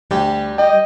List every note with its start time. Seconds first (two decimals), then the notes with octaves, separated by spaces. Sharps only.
0.11 D2 G3 G4
0.58 D#5 G5